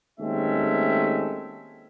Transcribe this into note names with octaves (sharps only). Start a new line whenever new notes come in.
D#2 G#3 A3 C4 C#4 E5